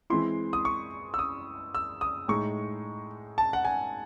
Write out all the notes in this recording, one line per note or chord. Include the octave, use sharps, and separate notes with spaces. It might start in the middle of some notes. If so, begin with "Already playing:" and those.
E3 G#3 C4 E4 C6
D#6
C#6
E6
D#6
E6
D#6
A2 G#3 D#4 C#6
A5
F#5
G#5